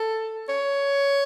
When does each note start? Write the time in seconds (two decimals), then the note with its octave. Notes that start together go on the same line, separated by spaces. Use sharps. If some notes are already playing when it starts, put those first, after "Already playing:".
Already playing: A4
0.49 C#5